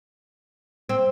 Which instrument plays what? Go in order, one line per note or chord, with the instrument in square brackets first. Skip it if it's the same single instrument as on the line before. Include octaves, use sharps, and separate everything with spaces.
[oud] C4